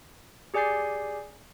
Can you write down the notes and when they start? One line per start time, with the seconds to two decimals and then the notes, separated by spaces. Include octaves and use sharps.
0.54 G4 G#4 D5 G#5 G6 C7